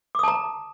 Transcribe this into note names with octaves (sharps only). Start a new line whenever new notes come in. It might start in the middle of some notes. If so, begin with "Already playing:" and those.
A5 A#5 D6 D#6